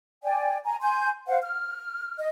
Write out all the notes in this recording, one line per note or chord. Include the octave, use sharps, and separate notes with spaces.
D5 G5 G#5
G#5 A#5
G#5 C6 G6
C5 F5 F#5
F6
D#5